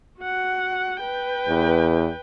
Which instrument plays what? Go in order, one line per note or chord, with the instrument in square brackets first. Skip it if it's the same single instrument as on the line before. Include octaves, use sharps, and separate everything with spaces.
[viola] F#4 F#5
B4 G5
[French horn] E2